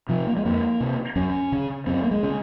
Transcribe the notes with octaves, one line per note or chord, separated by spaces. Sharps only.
C3 F3
A#3
G#3
F2 A#3
C3
F#2 C#4
C#3
F#2 C4
A#3
G#3
C#3